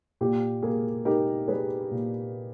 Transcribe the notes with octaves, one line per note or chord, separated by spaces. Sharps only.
A#2 G4
A#3 G#4
D#4 G4 A#4
G3 G#4 B4
A#2